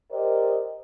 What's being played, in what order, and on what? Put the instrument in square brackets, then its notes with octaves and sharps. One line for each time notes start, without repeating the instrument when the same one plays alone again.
[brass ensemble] G4 A#4 C5 D5 D#5